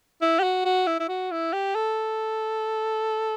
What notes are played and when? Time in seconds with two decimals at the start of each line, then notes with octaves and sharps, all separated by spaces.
0.22 E4
0.39 G4
0.43 F#4
0.65 F#4
0.87 E4
1.00 E4
1.09 F#4
1.31 E4
1.53 G4
1.75 A4